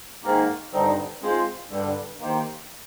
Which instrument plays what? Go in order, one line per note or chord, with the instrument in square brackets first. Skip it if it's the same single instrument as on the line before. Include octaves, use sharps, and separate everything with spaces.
[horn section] G#2 D#3 A#3
G2 D3 G3 C4 D#4
G#3 C4 F4 C5
G2 D3 G3
D#3 A#3 D#4 G4 C5